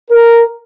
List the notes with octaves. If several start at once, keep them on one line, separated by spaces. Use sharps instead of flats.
A#4